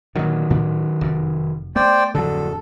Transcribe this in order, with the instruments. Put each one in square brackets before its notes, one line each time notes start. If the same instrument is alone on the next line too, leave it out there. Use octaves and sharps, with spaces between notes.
[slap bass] A#2 D3 [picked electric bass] D#3 F#3
[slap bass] D2 A2 D4
F1 F#2
[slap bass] A3 B3 [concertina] C5 D5 G5
[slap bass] D1 F2 [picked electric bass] D3 F#3 [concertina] A4